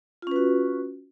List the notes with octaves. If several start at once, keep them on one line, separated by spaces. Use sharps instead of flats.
C#4 F4 F#4 B4